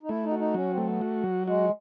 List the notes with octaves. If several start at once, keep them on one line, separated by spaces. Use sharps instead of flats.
D#4
A3 E4
D#4
F#4
D#4
F#3 C#4
C4
A3
B3
F#4
F#3
G#3 F#4